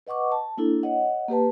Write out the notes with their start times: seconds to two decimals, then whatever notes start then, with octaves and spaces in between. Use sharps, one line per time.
0.07 B4 D#5 F#5 C#6 D6
0.32 A5
0.57 A#3 D4 E4 A4
0.83 C#5 D#5 F#5
1.28 A#3 G4 B4 A5